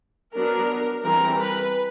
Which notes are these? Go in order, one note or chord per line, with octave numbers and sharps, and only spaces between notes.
F#3 B3 D4 A#4
E3 G3 C4 A#4
B4